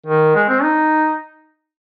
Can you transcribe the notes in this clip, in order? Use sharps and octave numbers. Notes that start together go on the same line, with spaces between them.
D#3
G#3
C4
D#4